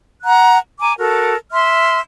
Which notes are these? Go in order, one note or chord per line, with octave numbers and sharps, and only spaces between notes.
F#5 A#5 F#6
G#5 A#5 D6
F#4 A4 A#4
E5 C6 F6